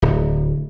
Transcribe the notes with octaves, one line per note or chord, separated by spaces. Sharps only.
D1